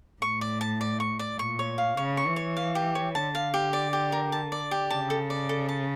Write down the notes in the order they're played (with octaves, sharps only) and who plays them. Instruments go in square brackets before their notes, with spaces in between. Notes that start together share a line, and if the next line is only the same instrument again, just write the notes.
[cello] A2 [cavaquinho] C#6
[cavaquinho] D5
A5
D5
C#6
D5
[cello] A#2 [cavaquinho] C#6
[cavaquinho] C#5
F5
[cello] C#3 [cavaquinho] C#5
[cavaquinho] C#6
[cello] E3
[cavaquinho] C#5
F5
G4
C#5
[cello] D3 [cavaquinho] A5
[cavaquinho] F5
G4
D5
G4
A#4
A5
D5
G4
[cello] C#3 [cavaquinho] A5
[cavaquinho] A4
D5
A4
A5